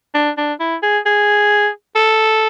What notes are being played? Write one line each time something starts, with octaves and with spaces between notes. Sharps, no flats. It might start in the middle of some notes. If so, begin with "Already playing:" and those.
D4
D4
E4
G#4
G#4
A4